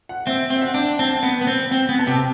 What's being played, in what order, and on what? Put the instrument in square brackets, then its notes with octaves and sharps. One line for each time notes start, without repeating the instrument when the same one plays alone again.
[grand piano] F#5
[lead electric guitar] C4 [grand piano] E5
[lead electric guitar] C4
[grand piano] E5
F#5
[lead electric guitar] D4
[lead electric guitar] C4 [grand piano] A5
[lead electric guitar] B3
B3
C4
[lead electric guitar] C4 [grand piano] G5
[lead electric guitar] B3
[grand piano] A5
[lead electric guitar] C3 [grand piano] G5